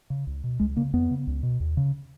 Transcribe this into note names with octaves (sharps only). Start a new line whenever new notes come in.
C#3
C#2
B2
C#2 G#3
C#3 A#3
F2 B3
C#3
C#2
B2
D#2
C#3